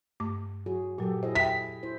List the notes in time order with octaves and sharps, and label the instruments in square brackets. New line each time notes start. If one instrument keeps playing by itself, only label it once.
[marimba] G2 A3 D6
[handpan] F#3 F#4 G#4
[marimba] A#2 F#3 [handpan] G4 A4
[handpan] E4 G#4 D#5 [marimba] C5
[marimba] E5 G5 [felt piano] B6
[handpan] E4 C5